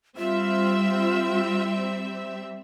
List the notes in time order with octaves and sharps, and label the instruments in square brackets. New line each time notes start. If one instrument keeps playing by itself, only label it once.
[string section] G3 C4 E5 [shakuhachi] F4